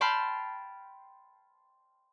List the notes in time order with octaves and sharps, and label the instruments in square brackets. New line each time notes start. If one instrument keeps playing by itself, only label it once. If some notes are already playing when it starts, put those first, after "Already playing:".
[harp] G5 A5 B5 C6 F6